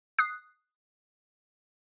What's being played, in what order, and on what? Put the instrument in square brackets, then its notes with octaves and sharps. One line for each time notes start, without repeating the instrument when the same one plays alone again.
[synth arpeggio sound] D#6 F#6 C7